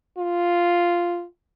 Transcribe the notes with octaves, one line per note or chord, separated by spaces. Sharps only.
F4